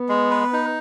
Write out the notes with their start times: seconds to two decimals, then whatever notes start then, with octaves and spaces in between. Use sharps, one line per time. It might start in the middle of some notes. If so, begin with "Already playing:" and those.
Already playing: B3
0.09 G#3
0.31 B4
0.53 D#4